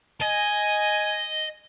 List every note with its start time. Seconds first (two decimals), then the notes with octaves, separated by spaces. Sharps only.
0.21 D#5 G#5